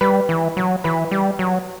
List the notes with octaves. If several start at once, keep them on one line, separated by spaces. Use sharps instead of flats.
G3 B4
E3
F#3
E3 B4
G3
F#3